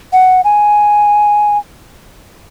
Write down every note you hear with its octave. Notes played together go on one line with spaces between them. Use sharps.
F#5
G#5